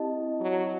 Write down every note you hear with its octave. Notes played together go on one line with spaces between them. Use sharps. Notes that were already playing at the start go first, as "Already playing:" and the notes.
Already playing: C4 E4 G4 D#5 A5
F#3